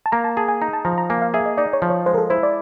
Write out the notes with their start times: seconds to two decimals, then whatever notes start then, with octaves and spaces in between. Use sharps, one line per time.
0.06 A5
0.12 A#3 A#5
0.24 A5
0.37 G#4 A5
0.48 G#5
0.61 D#4 A#5
0.73 A5
0.85 F3 A#5
0.98 A#5
1.09 A#3 G#5
1.22 F5
1.34 G#4 E5
1.46 D#5
1.58 D#4 D5
1.73 C#5
1.82 F3
1.90 C#5
2.06 G#3 C5
2.14 A#4
2.18 A4
2.30 E4 C5
2.43 D5